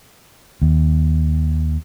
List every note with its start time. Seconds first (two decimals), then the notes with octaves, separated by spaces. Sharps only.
0.62 D#2